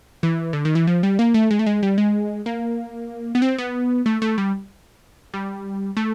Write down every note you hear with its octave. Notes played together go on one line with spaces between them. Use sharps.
E3
D3
D#3
E3
F3
G3
A#3
A3
G#3
A3
G#3
G3
G#3
A#3
B3
C4
B3
A3
A3
G3
G3
A3